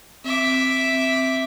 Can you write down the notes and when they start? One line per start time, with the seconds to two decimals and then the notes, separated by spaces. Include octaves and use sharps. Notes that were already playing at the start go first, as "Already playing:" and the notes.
0.24 C4 E5 D6
0.93 C4